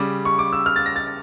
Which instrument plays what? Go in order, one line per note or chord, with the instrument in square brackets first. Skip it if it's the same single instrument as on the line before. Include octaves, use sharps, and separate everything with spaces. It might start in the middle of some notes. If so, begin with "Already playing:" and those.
Already playing: [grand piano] C#3 G3 D6
C#6
D6
E6
F6
A6
A#6
A6